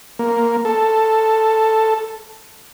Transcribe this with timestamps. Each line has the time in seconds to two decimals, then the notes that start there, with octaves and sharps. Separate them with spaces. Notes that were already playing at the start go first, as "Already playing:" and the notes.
0.19 A#3
0.65 A4